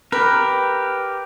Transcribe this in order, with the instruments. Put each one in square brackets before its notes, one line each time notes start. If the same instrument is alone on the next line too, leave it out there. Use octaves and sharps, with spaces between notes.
[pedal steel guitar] G4 A#4 [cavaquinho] B4